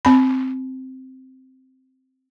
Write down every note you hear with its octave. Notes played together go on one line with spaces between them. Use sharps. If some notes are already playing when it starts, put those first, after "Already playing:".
C4 B5